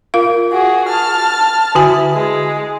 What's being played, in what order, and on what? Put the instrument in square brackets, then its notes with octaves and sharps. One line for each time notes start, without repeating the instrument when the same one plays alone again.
[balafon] F4 A#4 F5
[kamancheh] F#4 G#4
A5 F6
[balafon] D3 F#4 G#5 [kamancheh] E4
[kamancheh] G#3